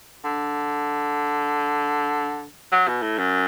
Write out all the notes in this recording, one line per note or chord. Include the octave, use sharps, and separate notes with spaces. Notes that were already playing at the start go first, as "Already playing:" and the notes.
D3
F#3
B2
A2
F#2